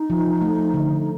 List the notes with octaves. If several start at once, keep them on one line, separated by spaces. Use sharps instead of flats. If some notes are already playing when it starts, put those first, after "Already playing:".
Already playing: D#4
F3
A3
D3